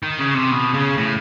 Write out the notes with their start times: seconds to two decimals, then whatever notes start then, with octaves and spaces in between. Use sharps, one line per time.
0.03 D#3
0.19 C#3
0.34 C3
0.51 B2
0.74 C#3
0.98 A2